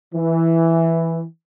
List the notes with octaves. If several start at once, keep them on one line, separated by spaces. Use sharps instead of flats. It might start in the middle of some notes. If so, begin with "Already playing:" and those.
E3